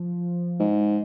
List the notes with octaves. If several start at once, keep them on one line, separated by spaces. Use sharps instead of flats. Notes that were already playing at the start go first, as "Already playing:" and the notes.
Already playing: F3
G#2